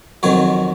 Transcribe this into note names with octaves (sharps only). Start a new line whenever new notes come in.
F2 D#3 F#3 C#5